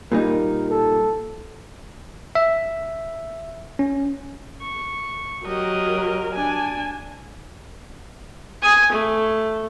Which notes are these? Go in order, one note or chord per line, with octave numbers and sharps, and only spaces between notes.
A#2 G3 D#4 A#4
A4
E5
C#4
C#6
F#3 G4 A#4 D#5
D4 G#5 A5
G#5 D#6
A3